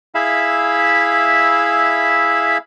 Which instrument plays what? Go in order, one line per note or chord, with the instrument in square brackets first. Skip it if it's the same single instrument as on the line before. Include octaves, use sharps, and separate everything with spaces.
[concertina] E4 G#4 E5 F5 B5 E6